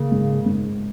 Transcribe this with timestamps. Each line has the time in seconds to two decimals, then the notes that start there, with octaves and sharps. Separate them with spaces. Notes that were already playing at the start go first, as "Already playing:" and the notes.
Already playing: C#3 A#3
0.12 G#2
0.46 G#2